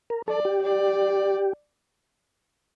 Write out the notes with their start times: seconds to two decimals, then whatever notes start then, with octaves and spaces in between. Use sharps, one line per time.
0.10 A#4
0.28 A4 D5
0.45 G4
0.62 D5